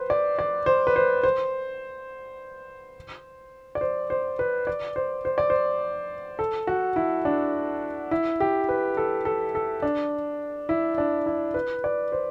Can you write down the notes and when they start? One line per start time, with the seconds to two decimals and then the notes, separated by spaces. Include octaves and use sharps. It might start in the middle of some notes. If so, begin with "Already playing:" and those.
Already playing: B4 C5
0.10 D5
0.39 D5
0.66 C5
0.87 B4
0.96 C5
1.23 C5
3.75 D5
3.81 C5
4.10 C5
4.39 B4
4.67 D5
4.96 C5
5.25 C5
5.38 D5
5.50 C5
6.39 A4
6.67 F#4
6.96 E4
7.25 D4
8.11 E4
8.40 G4
8.69 B4
8.97 A4
9.25 A4
9.55 A4
9.82 D4
10.69 E4
10.98 D4
11.26 E4
11.54 B4
11.84 D5
12.12 C5